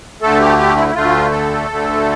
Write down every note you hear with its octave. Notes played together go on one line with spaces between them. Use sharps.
D2 D3 A3 A4
G4
G4
E4
E4
D2 D3 A3 F4
A4
D2 D3 A3